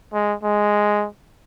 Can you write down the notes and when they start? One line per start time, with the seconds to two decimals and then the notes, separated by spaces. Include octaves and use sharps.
0.13 G#3
0.43 G#3